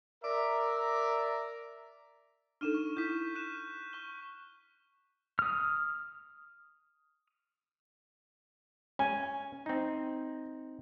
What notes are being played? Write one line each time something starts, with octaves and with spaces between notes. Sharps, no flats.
A#4 D5 E5 A#5
D4 D#4 A4 F6 D#7 E7
C#6
E4 G6 B6
F#6 D#7 E7
C#6 G7
D#6 F6
C#4 G#5
C4 D#4